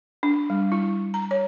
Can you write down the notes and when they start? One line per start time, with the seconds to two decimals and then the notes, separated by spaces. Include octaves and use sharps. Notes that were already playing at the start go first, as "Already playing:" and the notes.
0.23 D4
0.50 G3
0.72 E4
1.14 A#5
1.31 C#5